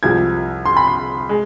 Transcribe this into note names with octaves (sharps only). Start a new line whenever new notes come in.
C2 C3 F3 G#3 G#6
C6
B5
C6
G#3